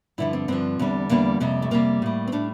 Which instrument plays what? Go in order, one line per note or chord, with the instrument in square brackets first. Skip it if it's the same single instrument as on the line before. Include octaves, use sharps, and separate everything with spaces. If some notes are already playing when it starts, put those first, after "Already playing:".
[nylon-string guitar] G2 D3 F3 E4
C4
G2 D3 F3 C4
E2 D3 G3
E2 D3 G3 A#3
F2 C3 G3
A3
F2 C3 G3 A#3
A2 G3
C4
A2 G3 D4